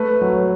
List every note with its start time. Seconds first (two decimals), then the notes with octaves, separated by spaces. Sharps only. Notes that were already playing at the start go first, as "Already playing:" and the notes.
Already playing: A3 B4
0.21 F#3